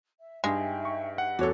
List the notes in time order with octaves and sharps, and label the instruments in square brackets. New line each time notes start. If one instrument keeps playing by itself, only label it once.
[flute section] E5
[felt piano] G2 [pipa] G#3 [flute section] D#4 E5 G5
[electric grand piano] C#6
F#5
[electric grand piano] E2 C#5 [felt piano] F#4 A4 [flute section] D6 F#6